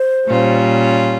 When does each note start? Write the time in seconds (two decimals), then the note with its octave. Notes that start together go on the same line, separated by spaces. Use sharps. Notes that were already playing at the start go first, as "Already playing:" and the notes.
Already playing: C5
0.28 A#2 G3 C#4 F4